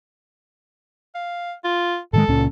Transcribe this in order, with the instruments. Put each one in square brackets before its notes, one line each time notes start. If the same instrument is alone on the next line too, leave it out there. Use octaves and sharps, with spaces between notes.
[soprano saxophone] F5
F4
[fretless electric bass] A2 D#3 G#3 [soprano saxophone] A4
[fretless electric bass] C#2 A#2 C#4